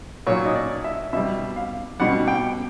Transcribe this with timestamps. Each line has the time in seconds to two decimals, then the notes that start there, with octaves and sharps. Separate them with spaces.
0.27 A#2 F#3 C#5
0.46 D#5
0.55 D5
0.84 E5
1.13 B2 G3 E5
1.56 F5
2.00 B2 G3 F#5
2.28 G5